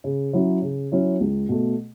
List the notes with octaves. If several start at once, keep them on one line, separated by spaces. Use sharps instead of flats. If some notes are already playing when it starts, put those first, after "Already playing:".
C#3
F#3 C#4 E4
C#3
F#3 C#4 E4
C#2
B2 A3